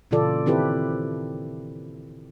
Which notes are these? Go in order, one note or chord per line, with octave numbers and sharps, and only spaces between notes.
A#2 C#3 E3 F4 A4 D5
D#3 C4 E4 G4 A4 B4